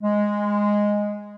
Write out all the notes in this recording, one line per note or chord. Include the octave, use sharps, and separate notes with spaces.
G#3